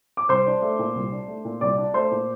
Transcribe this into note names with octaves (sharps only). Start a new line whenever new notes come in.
D6
C2 C5 C6
D4
A3
A#2
C2
D4
A3
A#2
C2 D5 D6
D4
A3 C5 C6
A#2